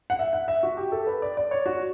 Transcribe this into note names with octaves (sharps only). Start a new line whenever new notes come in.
F#5
E5
F#5
E5
F#4
G4
A4
B4
D5
D5
C#5
F#4